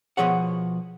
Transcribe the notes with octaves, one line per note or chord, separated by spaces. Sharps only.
B2 F3 G#4 C#5 F#5